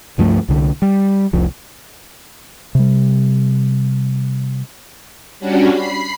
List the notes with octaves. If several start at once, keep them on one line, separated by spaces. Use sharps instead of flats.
C#2 G2 F3 A3
C2 D3
G3
F1 C2 F3
C3 G3
G3 C#4 D4 F#4
B5 C7